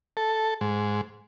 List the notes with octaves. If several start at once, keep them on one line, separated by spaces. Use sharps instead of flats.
A4
G#2